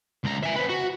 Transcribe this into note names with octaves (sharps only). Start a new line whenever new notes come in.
C#2 A#5
E5 G#5
C4 B4
F#4